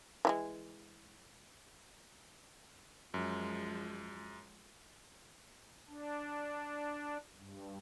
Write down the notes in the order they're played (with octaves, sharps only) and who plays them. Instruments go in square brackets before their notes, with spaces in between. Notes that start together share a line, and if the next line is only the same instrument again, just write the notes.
[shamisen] E3 G3 G#3
[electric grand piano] F#2 [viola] F3 G#3
[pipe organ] D4
G2